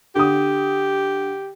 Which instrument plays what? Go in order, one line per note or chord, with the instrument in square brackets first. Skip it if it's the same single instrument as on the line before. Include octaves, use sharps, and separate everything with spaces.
[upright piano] D3 D#6 [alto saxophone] G4